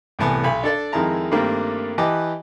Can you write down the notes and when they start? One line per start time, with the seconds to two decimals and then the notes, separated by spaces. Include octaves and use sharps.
0.19 C2 A2 E3 B3 G#5 A5
0.44 B1 G#5 B5
0.64 D4 A4 D5
0.93 F2 D#3 G#3 E4 A5 A#5
1.31 G2 D#3 G3 A3 A#3 C4
1.98 E3 G4 B4 D#5 A5 D6